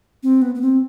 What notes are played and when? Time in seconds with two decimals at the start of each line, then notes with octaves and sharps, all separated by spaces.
0.23 C4
0.42 B3
0.55 B3
0.61 C4